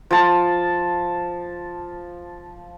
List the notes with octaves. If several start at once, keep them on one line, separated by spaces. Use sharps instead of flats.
F3 A5